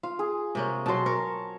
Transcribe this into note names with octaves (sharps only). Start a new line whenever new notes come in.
F4 F5
G#4
C3 A#3 C#4
B2 F#3 A5 C6
A#4 C#5